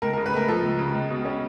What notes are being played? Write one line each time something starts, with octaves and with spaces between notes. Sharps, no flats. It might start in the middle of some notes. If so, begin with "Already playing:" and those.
C#2 A#4
C#3 A#4
B4
A3 A#4
F3 A4
C#2
C#3
C#2
B2
C#4